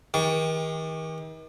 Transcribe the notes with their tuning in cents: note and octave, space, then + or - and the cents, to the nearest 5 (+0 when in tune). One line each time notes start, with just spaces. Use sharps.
D#3 +40 G4 +40 C#6 +30